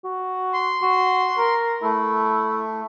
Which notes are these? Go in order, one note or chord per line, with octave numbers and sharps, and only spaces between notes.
F#4
C6
F#4
A#4
A3 E4